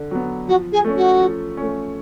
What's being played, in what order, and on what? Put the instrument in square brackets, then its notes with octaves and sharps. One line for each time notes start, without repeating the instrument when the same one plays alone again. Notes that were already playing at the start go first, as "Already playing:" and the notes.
Already playing: [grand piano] D3
F#3 B3
[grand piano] F3 [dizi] F#4
[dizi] G#4
[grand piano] A3 C#4
[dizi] F#4
[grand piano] F3
A3 C#4